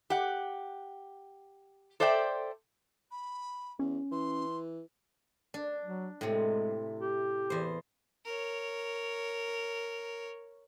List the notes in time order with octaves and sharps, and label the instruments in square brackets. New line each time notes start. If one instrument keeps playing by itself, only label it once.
[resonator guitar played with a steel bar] G4 F#5
A4 C5 D5 E5 F#5 G5
[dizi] B5
[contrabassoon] E2 [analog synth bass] C#4
[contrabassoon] E3 [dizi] C6
[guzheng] D4
[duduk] F#3
[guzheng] A2 C3 [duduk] G#3
[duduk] G4
[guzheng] E2 C5
[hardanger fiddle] A#4 C#5